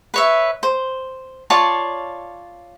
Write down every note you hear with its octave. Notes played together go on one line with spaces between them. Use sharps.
B4 C#5 E5
C5
F4 C#5 D5 A5